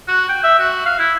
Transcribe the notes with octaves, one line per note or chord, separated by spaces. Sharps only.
F#4
G5
E5
F#4
F5
E4